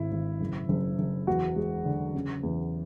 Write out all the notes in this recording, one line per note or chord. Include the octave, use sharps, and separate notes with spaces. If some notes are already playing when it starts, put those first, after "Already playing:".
Already playing: G#1 G#2 E4
G#1
F#1
F#1
F#1
E2 F#4
G#3
D3
C#3
E2